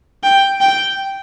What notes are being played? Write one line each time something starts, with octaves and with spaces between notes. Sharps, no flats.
G5
G5